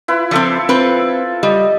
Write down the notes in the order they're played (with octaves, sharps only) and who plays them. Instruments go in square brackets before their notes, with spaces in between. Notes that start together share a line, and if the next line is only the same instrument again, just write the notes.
[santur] E4 B4 [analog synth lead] F4
[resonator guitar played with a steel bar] F3 C4 [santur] A4 E5 D6
[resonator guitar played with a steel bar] C4 B4
[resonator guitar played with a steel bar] G3 [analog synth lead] D#5